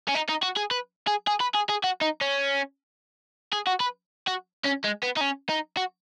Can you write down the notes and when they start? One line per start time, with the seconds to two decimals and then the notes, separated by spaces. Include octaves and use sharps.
0.08 C#4
0.14 D#4
0.29 D#4
0.42 F#4
0.56 G#4
0.71 B4
1.08 G#4
1.27 G#4
1.40 B4
1.54 G#4
1.69 G#4
1.84 F#4
2.01 D#4
2.21 C#4
3.52 G#4
3.67 F#4
3.80 B4
4.27 F#4
4.64 C#4
4.84 G#3
5.03 B3
5.17 D#4
5.21 C#4
5.49 D#4
5.77 F#4